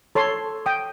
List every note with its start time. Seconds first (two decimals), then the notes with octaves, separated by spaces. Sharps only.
0.15 A4 C#5 A5 C6
0.66 G5 D#6